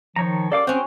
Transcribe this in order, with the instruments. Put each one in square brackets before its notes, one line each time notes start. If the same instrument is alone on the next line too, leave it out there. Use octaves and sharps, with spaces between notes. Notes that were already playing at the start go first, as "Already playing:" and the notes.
[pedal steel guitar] D#3 C#5 A#5 [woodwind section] F3
[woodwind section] C#4 G4 A#4 [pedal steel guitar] A4 F5 D6 [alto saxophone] D5
[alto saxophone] C4 [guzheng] C#4 F#4 [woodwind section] G#4 G5 [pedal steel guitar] C5 C6